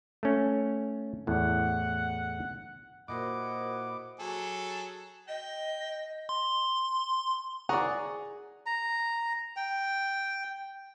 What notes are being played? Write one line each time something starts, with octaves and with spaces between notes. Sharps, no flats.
A3 C#4
E2 A2 F#5
A#2 E4 F#4 A#4 C5 D#5 F#5 D6
F#3 G#4 A4
D#5 G5
C6
G#4 D5 F#5 A#5 C#6
A#5
G5